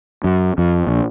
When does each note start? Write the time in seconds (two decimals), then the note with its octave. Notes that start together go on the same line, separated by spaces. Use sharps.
0.24 F#2
0.58 F2
0.87 A#1